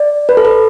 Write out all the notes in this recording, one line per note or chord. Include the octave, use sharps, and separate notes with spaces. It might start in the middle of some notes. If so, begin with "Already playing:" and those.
Already playing: D5
B4
A4
B4